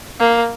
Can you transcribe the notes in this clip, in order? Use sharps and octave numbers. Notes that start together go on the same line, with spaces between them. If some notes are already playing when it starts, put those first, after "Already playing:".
A#3